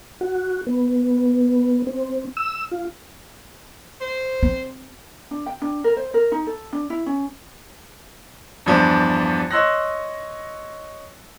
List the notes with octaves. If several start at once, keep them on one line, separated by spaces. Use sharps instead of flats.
F#4
B3
C4
E6
F4
C5
C4
D4
G5
D4
A#4
C5
A#4
D#4
A4
D4
E4
C#4
E2 G2 F3 D4
C#5 D#5 C6 E6 F#6 A#6